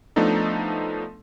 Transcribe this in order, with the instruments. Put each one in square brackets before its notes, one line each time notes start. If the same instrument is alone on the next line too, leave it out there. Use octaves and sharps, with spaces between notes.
[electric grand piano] F3 A3 B3 D4 D#4 A4